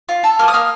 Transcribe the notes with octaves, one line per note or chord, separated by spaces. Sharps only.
F4
A4
A#3 F6
D#6
A#3 F6